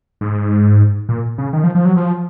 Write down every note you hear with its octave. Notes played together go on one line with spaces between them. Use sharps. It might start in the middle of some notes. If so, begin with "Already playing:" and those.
G#2
A#2
C#3
D#3
F3
F3
F#3
F3